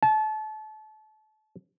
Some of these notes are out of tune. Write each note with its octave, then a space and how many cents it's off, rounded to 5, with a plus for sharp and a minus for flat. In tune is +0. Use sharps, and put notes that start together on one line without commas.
A5 -30